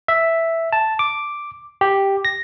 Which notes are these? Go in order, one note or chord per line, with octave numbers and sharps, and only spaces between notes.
E5
A5
D6
G4
A#6